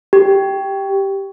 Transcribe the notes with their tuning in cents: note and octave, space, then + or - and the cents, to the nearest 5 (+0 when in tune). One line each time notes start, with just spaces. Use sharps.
G4 +0